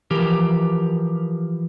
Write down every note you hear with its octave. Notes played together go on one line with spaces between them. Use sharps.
E3 F3 G4 A#4